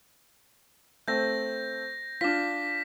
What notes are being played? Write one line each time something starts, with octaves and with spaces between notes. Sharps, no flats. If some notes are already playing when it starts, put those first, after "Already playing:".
A3 C4 G6 A#6
D4 F4 D6 B6